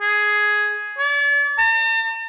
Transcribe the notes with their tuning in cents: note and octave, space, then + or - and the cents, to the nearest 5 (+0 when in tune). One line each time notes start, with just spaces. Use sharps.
G#4 +10
D5 -40
A5 +45